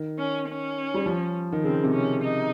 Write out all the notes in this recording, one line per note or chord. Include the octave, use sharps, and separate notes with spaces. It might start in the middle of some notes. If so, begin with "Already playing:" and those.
Already playing: D#3
C#4
C#4
G3
F3
D#3
C#3 C4
C3
C#4
D#4